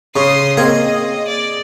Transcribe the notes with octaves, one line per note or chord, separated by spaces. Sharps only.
C#3 C6 D#6
A#3 C4 G#4 D#5
D5